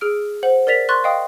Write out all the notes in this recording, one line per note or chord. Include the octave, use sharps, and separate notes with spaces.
G#4 E6 F6 D7
C5 F#5 F#7
A#4 D5 A6 B6 F7
C6 C#6 F#6 A6
D#5 F5 G5 D#6